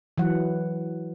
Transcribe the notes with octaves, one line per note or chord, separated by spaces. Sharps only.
E3 F#3 F#5